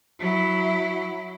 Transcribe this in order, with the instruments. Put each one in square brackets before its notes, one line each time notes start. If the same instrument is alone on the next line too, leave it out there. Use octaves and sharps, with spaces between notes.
[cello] F#3 E4